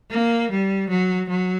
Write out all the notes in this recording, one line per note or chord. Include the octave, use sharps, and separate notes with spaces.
A#3
G3
F#3
F#3